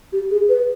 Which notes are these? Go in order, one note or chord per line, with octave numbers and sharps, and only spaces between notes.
G4
G#4
B4